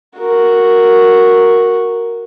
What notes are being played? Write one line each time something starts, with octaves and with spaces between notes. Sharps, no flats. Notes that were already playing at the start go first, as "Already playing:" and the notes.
F#4 A#4